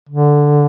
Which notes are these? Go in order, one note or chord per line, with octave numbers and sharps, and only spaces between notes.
D3